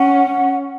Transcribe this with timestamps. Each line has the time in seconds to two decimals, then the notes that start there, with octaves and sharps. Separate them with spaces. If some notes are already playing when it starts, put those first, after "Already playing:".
Already playing: C#4 F#5